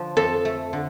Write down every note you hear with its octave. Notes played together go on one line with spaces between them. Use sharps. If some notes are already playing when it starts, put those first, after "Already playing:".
Already playing: D3 F3 D4
F2 A4
A3
D3